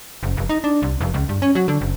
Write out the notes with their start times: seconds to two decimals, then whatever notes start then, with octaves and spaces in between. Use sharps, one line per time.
0.23 F#1
0.37 F1
0.49 D#4
0.64 D4
0.82 C2
1.01 F1
1.14 C#2
1.29 G2
1.42 C#4
1.55 F#3
1.68 D3
1.81 F#1